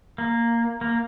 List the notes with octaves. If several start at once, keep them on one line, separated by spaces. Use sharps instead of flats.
A#3
A#3